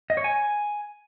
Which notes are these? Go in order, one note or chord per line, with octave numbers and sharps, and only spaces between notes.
D#5
C#5
G#5